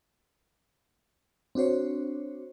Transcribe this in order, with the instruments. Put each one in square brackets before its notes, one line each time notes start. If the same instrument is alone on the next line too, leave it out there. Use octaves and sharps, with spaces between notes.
[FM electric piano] C4 D4 F#4 C5 C#5